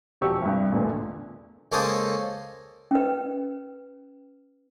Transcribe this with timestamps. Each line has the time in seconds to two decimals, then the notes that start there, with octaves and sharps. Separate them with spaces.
0.21 E1 F3 F#4 G4 C#6 E6
0.42 C2 G2
0.72 A1 E2 A#2 D3
1.72 C#2 A#3 C#4 A4 C5 D#6
2.91 C#4 B4